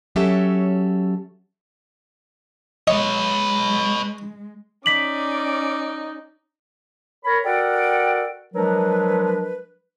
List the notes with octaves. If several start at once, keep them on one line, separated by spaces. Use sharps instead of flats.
F#3 C#4 G4 A4 E5
G#3 B4 C#5 D#5
C#4 D#4 D5 D6 B6 F#7
A#4 C#5 B5
F#4 A4 A#4 D5 F#5 G5
F3 F#3 G#3 D4 A#4 B4